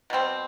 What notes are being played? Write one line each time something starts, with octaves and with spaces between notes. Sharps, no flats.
B2 G3 C4